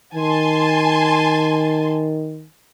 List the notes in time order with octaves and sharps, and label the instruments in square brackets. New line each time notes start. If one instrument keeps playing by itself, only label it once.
[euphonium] D#3 [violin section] G#5 A5 C6